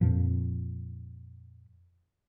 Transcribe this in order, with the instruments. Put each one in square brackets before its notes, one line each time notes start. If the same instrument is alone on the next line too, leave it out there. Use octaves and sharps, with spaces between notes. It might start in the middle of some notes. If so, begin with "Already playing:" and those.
[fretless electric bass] F2 A#2 F3